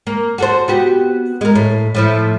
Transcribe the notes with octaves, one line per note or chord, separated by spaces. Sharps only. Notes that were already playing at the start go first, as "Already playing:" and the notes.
A#3
F#4 A4 C5
B3 F#4 G4
G#3 A#4
A2
A2 F3 E4